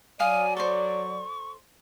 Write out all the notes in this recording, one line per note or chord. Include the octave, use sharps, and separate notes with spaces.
F#3 D5 F5 G#5 D#6
A4 C5 C#6